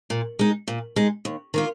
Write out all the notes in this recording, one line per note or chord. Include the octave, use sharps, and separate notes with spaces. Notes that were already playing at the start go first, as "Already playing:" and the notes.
A#2
G#3 D#4
A#2
G#3 D#4
D#2
D#3 A#3 F4